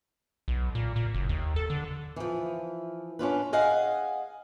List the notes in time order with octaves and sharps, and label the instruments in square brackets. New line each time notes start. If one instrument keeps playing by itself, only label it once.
[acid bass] B1
A#2
A#2
F#1
D#2
A4
D3
[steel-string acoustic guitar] E3 F3
C#4 D4 F4 B4
G#4 D#5 F5 F#5 G#5